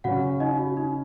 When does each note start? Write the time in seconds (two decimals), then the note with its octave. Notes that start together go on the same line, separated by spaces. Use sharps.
0.04 C#3 F#3 C#4 F#4 F#5
0.40 D#4 D#5
0.59 F#4
0.77 D#4